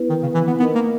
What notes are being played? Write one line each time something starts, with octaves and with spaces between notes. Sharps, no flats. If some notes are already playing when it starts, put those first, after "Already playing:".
Already playing: B3 E4 B4
D#3
C#3
E3
B3
B3 D#4 A#4 D#5
A#3